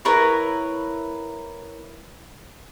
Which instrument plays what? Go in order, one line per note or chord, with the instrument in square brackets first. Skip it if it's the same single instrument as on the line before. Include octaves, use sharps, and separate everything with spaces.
[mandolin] E4 A#4 B4 C#5